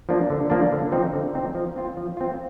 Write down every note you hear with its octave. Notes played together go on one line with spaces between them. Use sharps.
F3 A#3 D4
D3
F3 A#3 D4
D3
F3 C4 D#4
D3
F3 C4 D#4
F3
C4 F4
F3
C4 F4